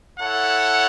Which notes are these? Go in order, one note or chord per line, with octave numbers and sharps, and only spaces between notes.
E4 A4 C#5 F#5